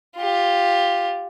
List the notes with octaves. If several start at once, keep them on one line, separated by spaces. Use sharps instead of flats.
F4 G4